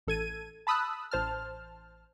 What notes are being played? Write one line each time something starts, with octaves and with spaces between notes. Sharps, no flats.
A1 A4 G#6 D#7
A5 B5 D#6 E6 F#6
A1 C5 A5 F6